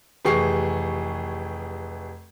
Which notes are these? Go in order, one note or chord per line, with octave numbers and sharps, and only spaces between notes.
F1 E3 G4 G#4 C#6 C7